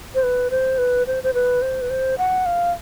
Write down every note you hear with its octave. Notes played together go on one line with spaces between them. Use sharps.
C5
B4
C5
B4
C5
C5
B4
C5
B4
C5
F#5
F5